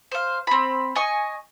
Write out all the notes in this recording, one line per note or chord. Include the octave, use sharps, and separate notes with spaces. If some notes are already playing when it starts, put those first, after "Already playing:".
C5 F5
C4 B5
D#5 G#5 C#6